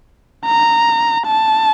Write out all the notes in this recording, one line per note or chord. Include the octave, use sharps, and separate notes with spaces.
A#5
A5